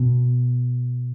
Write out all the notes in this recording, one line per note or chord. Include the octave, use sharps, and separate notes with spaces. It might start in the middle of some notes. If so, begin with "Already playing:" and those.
Already playing: B2